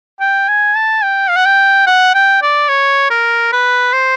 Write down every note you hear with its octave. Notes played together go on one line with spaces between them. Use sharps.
G5
G#5
A5
G5
F5
F#5
G5
F#5
G5
D5
C#5
A#4
B4
C5